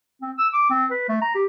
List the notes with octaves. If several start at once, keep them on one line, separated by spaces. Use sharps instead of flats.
C4
E6
D6
C4
B4
A3
A#5
G4